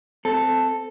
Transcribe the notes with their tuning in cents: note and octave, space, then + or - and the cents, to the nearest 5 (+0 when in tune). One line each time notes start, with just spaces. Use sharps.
C4 -15 A4 +0